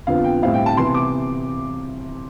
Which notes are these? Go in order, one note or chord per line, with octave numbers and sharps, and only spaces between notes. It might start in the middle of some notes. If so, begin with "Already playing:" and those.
F2 D3 F3 B3 F4 F5
G5
A2 G3 C4 E4 F5
G5
A5
C3 E3 B3 C6
D6